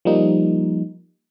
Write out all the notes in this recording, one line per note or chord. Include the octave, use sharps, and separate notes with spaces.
F3 G3 A#3 D#4